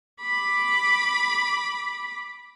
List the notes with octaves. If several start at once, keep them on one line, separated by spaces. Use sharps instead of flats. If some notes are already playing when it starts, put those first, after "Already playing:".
B5 D6